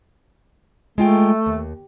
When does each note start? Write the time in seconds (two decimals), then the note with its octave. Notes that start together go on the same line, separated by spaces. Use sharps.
0.98 G#3 A3 F4 G5
1.46 D#2